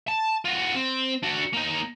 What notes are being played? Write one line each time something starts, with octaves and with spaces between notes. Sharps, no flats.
A5
F4 F#4
C4
D4 F#4
A#3 D#4